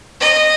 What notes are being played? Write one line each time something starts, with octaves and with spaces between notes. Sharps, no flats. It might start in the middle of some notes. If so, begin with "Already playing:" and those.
D#5